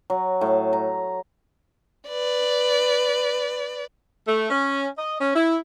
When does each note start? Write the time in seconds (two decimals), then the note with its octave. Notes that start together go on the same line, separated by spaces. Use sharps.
0.10 F#3
0.41 A2
0.73 A#5
2.08 B4 D5
4.27 A3
4.50 C#4
4.98 D#5
5.21 C#4
5.36 E4